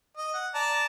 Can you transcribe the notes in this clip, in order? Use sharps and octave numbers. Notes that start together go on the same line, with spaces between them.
D#5
F#5
D5 A5 A#5